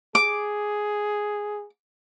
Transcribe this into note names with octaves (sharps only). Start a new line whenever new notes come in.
G#4 D6